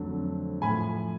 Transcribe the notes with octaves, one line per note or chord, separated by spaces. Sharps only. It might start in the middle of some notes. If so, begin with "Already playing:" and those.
Already playing: F2 D3 F#3 A3
A2 F3 G#5 B5